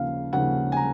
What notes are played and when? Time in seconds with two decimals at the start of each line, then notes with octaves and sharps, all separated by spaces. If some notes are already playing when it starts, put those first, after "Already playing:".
Already playing: D#2 C#3 F3 A#3 F5
0.33 D#2 C#3 F3 A#3 F#5
0.72 G#5
0.77 A#5